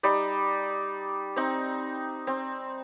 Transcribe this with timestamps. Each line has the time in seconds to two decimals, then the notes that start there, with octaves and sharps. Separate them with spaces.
0.03 G3 D#4 D5
1.36 C4 D#4
2.27 C4